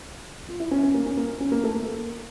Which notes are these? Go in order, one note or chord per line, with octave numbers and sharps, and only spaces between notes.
F4
E4
C#4
C#4
A#3
C#4
A#3
C#4
A#3
A3
A#3